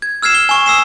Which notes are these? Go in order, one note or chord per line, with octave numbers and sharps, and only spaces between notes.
G#6
E6 F6 G#6 C7 E7
G7
G#5 C#6
D#6 E6 C7 E7